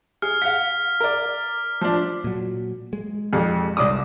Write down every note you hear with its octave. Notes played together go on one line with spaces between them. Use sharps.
G#4 F6
F5 F#5 B6
A#4 D5
F3 D4
A#2 F#3
G#3
F2 G4 G#4
C2 D6 D#6